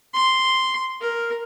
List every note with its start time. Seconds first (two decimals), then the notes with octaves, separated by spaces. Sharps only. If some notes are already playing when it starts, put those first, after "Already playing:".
0.14 C6
1.01 A#4